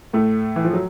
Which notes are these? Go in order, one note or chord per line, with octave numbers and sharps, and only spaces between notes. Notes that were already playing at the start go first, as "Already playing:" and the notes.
A2 A3
E3
F3
F#3